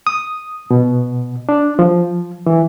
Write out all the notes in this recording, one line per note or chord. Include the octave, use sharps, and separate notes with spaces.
D#6
B2
D4
F3
E3